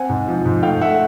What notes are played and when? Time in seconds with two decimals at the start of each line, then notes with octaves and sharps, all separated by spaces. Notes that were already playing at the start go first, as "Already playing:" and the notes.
Already playing: C4 F#5 G#5
0.09 G#2
0.28 F3
0.45 G#2
0.63 A3 F5 G5
0.81 A3 E5 F#5